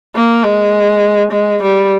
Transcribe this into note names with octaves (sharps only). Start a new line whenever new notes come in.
A#3
G#3
G#3
G3